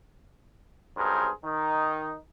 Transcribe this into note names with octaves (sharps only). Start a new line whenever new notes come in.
B1 G2 G#4 A#4 C5
D#3 D#4